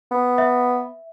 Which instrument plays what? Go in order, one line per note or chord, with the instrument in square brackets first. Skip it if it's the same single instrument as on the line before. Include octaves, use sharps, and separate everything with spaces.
[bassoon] B3
[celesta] E5